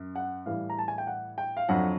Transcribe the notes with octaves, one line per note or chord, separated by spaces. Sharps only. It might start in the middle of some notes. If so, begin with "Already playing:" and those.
Already playing: F#2
F#5
A2 E3 G3 F5
A#5
A5
G#5
G5
F#5
G5
F5
F2 D3 F#3 F#5